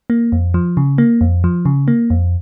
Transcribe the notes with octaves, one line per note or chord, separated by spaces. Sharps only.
A#3
F2
F3
C#3
A#3
F2
F3
C#3
A#3
F2